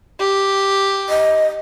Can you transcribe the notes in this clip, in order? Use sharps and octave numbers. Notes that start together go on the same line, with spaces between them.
G4
D#5